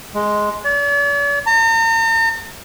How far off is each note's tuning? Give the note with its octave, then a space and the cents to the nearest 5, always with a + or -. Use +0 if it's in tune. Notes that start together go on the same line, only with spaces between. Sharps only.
G#3 +5
D5 -45
A#5 -45